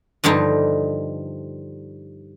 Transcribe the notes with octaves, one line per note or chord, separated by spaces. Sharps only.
G2 D3 F3 G3 D#4